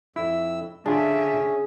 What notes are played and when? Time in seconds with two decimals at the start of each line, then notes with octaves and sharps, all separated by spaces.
0.16 F2 E4 E6
0.86 D3 C#4 D4 F4 G#4 D5 E5